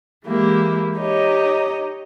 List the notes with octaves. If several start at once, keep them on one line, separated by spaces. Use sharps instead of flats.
E3 G#3 A#3 E4 G4
D#4 G4 C#5 D#5